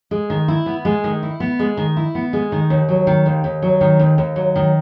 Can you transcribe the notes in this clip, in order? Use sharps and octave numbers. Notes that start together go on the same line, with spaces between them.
G#3
D#3
E4
B3
G#3
D#3
E4
B3
G#3
D#3
E4
B3
G#3
D#3
D#2
F#3
D#3
D#2
D#2
F#3
D#3
D#2
D#2
F#3
D#3